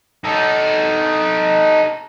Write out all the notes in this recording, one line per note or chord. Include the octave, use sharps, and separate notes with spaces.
D#4 A4